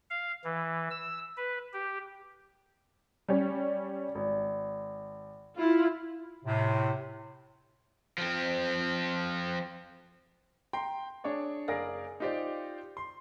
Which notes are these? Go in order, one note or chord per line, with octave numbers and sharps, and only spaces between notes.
F5
E3
E6
B4
G4
G3 C#4
G#1
E4 F4
A2 C3
F3 C4
G5 A#5 C6
D4 G#4 C#5 D5
F#1 G#4 A#4 D5 F5 A#6
D#4 F4 G4 C5 D5
C6